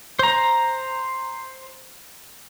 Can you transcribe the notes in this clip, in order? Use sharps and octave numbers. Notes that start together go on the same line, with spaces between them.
C5 A#5